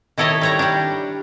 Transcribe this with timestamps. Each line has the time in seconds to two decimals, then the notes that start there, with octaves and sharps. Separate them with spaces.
0.18 D#3 E4 A4 C#5 D#5
0.41 G3 C#5 A#5
0.59 G3 D4